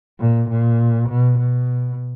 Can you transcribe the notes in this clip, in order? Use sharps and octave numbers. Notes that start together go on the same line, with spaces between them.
A#2
A#2
B2
B2